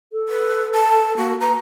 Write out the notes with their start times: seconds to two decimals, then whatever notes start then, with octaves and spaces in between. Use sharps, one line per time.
0.12 A4
0.29 B4
0.75 A5
1.17 A#3 F#4
1.41 B4 A#5